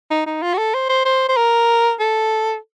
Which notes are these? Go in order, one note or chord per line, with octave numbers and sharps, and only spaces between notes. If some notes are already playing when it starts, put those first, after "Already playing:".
D#4
D#4
F4
F#4
A4
C5
C5
C5
C5
A#4
A4